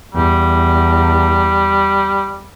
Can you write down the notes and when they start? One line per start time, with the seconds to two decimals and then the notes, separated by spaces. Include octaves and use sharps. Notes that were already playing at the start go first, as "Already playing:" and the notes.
0.14 E2 G3